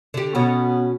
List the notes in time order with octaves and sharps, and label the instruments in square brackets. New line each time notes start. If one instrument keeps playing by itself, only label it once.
[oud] D3 G4
[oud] B2 C#4 F#4 [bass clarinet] B3